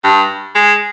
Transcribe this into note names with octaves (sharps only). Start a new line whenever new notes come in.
G2
G#3